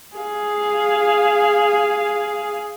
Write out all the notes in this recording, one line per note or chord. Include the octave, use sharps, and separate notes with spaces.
G#4 F5